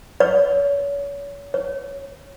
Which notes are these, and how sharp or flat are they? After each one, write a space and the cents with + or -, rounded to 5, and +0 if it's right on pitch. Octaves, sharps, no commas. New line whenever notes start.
C#5 +35
C#5 -10